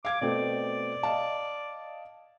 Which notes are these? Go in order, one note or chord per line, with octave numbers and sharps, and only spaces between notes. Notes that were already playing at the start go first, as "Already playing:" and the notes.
F5 D6 G#6 D7
B2 A3 C4 D5
D#5 F5 A5